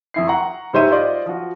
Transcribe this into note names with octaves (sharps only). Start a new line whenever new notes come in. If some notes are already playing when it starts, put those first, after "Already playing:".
F2 E4 C7
F#5 A#5 C#6
G#2 G3 C5 C#5 E5 D#7
F4 C5 D5 D#5
F3 F#4